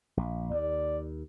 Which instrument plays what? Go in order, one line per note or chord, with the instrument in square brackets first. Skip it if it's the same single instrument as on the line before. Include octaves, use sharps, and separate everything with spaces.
[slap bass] A#1
[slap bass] D#2 [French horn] D5